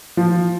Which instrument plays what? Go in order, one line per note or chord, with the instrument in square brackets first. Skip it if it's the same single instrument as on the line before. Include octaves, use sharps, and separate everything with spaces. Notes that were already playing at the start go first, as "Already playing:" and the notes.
[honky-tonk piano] F3